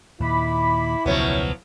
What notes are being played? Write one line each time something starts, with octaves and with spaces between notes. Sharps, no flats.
D#2 A#2 E4 B5 D6
E1 C#2 B2 F3 F#3 B3 C#4